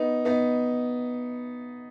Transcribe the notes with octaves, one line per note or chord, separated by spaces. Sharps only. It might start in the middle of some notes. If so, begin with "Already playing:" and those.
Already playing: B3 D#4
B3 D#4